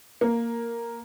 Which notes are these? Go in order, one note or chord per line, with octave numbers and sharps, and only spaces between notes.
A#3